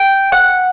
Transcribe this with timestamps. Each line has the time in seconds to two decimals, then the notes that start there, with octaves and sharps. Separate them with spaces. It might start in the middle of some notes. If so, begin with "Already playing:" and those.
Already playing: G5
0.32 F#5